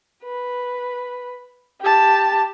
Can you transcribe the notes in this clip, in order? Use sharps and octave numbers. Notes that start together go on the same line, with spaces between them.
B4
G4 A5